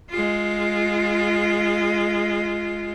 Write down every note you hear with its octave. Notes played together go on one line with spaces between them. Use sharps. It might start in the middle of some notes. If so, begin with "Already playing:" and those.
G#3 F4